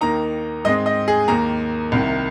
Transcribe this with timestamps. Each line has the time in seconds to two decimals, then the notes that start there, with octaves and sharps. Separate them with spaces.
0.01 D#2 D#3 A#3 D#4 A#5
0.65 G#2 G#3 C4 D#5
0.86 D#5
1.08 G#4
1.28 D#2 D#3 A#3 A#5
1.92 C2 C3 D#3